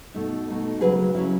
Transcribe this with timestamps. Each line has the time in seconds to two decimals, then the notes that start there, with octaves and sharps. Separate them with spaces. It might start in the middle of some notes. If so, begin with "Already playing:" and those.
0.14 B2 A3 D#4
0.48 B2 A3 D#4
0.81 C#3 F#3 C#4 G#4 B4
1.14 C#3 F#3 C#4 E4